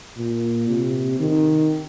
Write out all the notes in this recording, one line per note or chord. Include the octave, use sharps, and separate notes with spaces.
A#2
C3
D#3